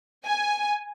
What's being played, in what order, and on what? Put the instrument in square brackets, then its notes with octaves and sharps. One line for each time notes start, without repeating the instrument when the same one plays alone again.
[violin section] G#5